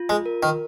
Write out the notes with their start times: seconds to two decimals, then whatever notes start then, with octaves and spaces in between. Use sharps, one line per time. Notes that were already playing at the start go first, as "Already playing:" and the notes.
Already playing: F4
0.09 G#3
0.26 A#4
0.43 D#3